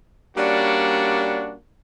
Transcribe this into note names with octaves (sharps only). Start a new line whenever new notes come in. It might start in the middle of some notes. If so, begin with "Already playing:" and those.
G3 A#3 C#4 D4 F#4